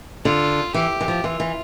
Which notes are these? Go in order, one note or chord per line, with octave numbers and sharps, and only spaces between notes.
D3 F4
E3 G4
E3
F3
E3 F4
E3